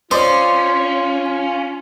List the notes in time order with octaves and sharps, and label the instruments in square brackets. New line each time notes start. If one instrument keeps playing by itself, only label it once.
[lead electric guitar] C#4 [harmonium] F4 [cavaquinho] C5 [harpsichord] D5 D#5